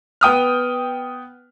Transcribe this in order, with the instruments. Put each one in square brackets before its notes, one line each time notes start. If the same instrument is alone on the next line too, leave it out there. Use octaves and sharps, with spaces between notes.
[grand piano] B3 G5 D#6 F6